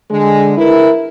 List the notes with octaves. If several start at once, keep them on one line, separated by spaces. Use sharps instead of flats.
D3 G#3
E4 A#4 B4